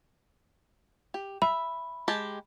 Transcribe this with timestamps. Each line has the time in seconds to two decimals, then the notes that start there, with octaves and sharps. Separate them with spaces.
1.14 G4
1.42 E5 B5
2.08 G#3 G4 A5